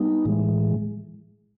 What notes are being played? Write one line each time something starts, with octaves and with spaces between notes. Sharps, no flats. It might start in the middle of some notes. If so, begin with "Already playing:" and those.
Already playing: G3 B3 D#4
A2 E3 G#3